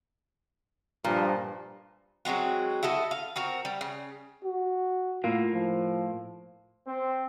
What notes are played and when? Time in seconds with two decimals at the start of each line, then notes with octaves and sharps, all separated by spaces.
1.04 G2 A#2 F3
2.25 F#3 G#3 C4 F#4
2.83 E4 F#4 A4 D#5
3.11 F5
3.36 C4 F#4 A#4
3.65 G3
3.81 C#3
4.44 F#4
5.24 A2 A#3 F4
5.53 F3
6.87 C4